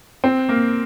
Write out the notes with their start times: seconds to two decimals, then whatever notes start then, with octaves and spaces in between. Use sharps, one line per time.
0.24 C4
0.49 A#3